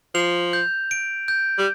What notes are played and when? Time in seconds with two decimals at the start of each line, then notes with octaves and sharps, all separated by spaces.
0.15 F3 F7
0.53 G6
0.91 D7
1.28 G6
1.58 G3